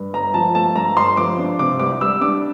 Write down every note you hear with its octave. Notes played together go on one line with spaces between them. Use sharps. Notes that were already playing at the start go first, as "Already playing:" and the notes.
Already playing: G2
G1 A#5
F3 A5
A3 A5
G2 A#5
G1 C6
F3 D6
D4
C3 D6
C2 D6
G3 E6
D4 D6